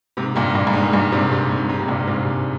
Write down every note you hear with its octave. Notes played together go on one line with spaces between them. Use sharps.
G#2 C3
G2 A#2
G2
G2
G#2
G2 A#2
G#2 C3
G#2 C3
G#2
G#2
C3
G2 A#2
G#2 C3